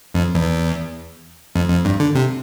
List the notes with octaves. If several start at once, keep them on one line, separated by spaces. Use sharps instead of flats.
F2
E2
F2
F2
G2
D3
C3